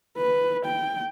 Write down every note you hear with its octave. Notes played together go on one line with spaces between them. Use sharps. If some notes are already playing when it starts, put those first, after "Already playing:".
B4
G5